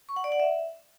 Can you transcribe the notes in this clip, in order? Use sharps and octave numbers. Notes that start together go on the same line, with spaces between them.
C#6
F#5
D5
F#5
E5